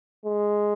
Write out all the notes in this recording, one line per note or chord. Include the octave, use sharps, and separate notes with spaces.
G#3